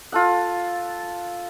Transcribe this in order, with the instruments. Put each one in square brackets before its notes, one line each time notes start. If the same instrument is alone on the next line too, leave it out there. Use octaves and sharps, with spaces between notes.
[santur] F4 A4 F#5